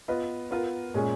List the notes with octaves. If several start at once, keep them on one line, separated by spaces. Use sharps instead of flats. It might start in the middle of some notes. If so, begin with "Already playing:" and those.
B3 F4 B4 D#5
B3 F4 A#4
A#2 G#3 C#4 G#4